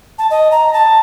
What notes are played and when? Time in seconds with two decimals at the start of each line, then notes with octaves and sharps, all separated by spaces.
0.19 A5
0.31 D#5
0.51 A#5
0.73 A5